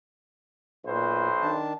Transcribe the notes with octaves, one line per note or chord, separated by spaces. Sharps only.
B1 A#2 B4 C5
D#3 D4 A5